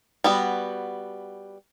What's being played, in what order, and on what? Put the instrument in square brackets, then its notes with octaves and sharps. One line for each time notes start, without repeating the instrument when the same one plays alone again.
[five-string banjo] G3 B3 F#4